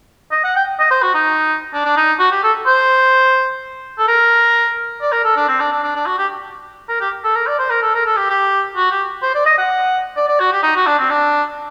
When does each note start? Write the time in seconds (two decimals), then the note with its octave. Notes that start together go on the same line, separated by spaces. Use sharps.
0.32 D#5
0.44 F#5
0.56 G5
0.79 D#5
0.90 C5
1.02 F#4
1.15 D#4
1.73 D4
1.85 D4
1.97 D#4
2.19 F#4
2.31 G4
2.43 A4
2.66 C5
3.98 A4
4.08 A#4
5.01 D5
5.12 A#4
5.24 A4
5.36 D4
5.48 C4
5.60 D4
5.72 D4
5.83 D4
5.95 D4
6.06 F#4
6.18 G4
6.89 A#4
7.01 G4
7.24 A4
7.35 A#4
7.47 D5
7.59 C5
7.70 A#4
7.82 A4
7.94 A#4
8.06 A4
8.17 G4
8.30 G4
8.76 F#4
8.91 G4
9.22 C5
9.35 D5
9.46 D#5
9.58 F#5
10.17 D5
10.28 D5
10.40 F#4
10.52 G4
10.63 D#4
10.76 F#4
10.86 D4
10.98 C4
11.10 D4